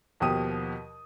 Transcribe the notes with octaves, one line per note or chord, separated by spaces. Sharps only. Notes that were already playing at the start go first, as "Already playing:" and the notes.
D#2 B2 F3 G4 D#6 D#7